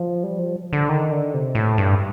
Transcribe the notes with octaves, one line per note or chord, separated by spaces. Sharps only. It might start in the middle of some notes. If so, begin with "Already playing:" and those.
Already playing: F3
G3
F3
D3
D#3
D3
C3
A2
G2